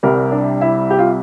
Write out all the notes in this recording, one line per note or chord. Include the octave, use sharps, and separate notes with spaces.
C2 C3 G3 A#4
D4
E4
G4
F4